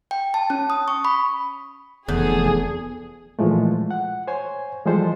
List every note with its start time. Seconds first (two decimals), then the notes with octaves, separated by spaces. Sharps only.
0.11 G5
0.34 A5
0.50 C#4
0.70 D#6
0.88 C#6
1.05 B5
2.08 F1 E2 G#4 A4
3.39 A#2 E3 F3 G#3 A3
3.91 F#5
4.27 C5 C#5 G#5
4.85 E3 F3 G3 G#3 A4 C5